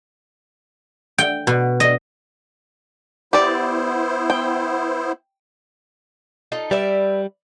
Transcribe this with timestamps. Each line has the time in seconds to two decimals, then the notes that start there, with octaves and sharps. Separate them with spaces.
1.18 G5
1.47 B2
1.80 D#5
3.33 B3 E4 G4 C5 D5
4.30 G5
6.52 D#4 F4 A4
6.71 G3 B4 D5 E5